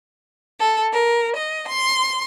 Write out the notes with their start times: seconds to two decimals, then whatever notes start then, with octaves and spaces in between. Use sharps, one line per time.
0.60 A4
0.92 A#4
1.36 D#5
1.67 C6